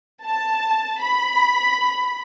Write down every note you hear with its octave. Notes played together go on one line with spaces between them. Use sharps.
A5
B5